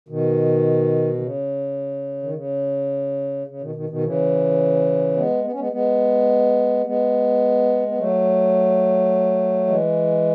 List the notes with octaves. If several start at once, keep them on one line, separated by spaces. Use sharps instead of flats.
B2 D#3
D#3
C#3
D#3
C#3
C#3
B2 D#3
B2 D#3
B2 D#3
C#3 E3
G#3 B3
B3
C#4
G#3 B3
G#3 B3
G#3 B3
B3
F#3 A3
E3 G#3